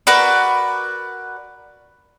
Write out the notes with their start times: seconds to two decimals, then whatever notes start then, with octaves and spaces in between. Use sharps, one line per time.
0.07 F#4 A#4 B4 D5